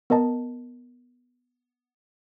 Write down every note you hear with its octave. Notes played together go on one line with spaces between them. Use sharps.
B3 A#4 D#5 A5